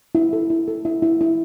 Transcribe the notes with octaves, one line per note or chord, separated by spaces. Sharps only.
E4
A4
E4
A4
E4
E4
E4